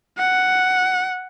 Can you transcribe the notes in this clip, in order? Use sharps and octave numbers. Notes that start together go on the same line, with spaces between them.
F#5